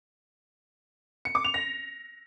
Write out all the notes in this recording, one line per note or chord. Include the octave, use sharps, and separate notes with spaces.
C#7
D6
F7
A#6